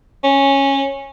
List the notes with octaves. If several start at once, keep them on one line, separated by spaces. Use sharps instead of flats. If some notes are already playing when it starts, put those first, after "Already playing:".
C#4